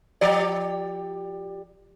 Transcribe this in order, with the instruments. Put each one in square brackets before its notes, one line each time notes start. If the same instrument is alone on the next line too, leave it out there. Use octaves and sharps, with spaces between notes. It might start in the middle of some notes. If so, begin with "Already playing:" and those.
[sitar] F3 G4 D5